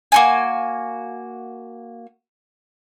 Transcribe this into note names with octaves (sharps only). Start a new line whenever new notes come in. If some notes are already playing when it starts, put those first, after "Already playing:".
A#3 F#4 G#5